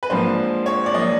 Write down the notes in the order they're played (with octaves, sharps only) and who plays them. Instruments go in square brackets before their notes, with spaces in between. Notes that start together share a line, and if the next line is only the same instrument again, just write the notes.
[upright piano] B4
G#2 F3 A#3 D4 C5
C#5
D5
F3 A#3 D4 D#5